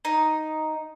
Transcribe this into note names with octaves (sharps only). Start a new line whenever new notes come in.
D#4